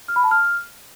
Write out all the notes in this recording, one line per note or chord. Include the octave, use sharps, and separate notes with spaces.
F6
B5
A5
F6